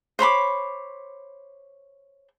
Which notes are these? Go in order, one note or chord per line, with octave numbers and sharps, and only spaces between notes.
C5 C#5 B5 D6